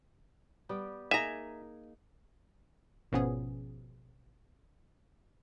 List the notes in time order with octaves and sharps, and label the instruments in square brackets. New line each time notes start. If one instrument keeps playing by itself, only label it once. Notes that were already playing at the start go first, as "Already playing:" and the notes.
[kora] G3 B3 G4
[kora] A#3 D#4 G#4 [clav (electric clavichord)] E5 [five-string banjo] G#5 A#5
[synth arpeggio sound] G#1 B2 F3 B3 C#4 G#4